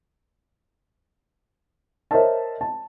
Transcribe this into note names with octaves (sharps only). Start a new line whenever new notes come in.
A#4 C5 C#5 D#5 E5 A5
A5